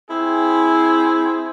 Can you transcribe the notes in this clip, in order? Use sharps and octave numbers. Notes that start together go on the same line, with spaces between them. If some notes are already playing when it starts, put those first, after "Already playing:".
C4 E4 G#4